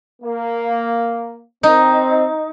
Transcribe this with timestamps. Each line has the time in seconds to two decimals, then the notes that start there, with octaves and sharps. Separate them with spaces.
0.21 A#3
1.63 C4 D#4